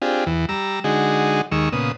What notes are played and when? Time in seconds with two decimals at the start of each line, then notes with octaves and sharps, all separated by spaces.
0.02 C4 D4 F4 G4 G#4
0.26 E2 E3
0.49 G3 A#5 E6
0.84 D3 G#3 D#4 F#4 G#4
1.52 D#2 D#3 G#3 C#6 E6
1.73 A#2 C#3 B3 D#6